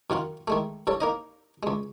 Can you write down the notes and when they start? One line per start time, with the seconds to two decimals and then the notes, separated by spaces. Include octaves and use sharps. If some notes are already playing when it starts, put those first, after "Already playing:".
0.10 F#2 D#3 F4 F#5
0.48 D#3 G#3 A3
0.87 G2 A4 C#5
1.01 A#3 D#4 D#5
1.63 C#2 G#3